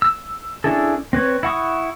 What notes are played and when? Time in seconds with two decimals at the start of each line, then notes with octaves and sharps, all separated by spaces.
0.02 E6
0.64 C#4 D4 E4 G#4 A4
1.13 C4 B4 C#5
1.43 E4 F#5 C#6 D#6